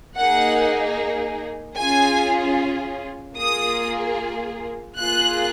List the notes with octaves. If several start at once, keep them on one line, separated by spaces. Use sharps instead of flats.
A#3 D#4 G#4 F#5
C#4 F4 G#4 G#5
A#3 F4 G#4 D#6
A#3 F4 G#4 F#6